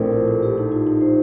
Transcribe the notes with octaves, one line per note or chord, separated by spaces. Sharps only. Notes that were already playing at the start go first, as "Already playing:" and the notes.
Already playing: A#1 A2 A3 C4 A4 A#4 C5
F4
A4
G4
D#4
F4
D#4
C5